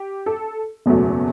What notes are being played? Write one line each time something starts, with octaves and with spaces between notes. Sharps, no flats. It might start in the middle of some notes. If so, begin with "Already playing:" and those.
Already playing: G4
A4
F#1 E2 B2 F#3 A3